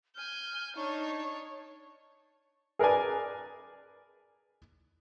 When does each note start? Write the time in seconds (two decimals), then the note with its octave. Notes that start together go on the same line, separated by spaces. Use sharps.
0.16 G#5 F6 G6
0.76 D4 D#4 C#5 C#6
2.79 G#4 A#4 B4 D5 G#5